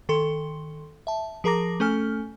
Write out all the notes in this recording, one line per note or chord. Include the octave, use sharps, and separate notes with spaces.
D#3 A4 C6
E5 A5
F3 G#4 A#4 A#5 D6 A#6
A3 C#4 A4 G#5 F6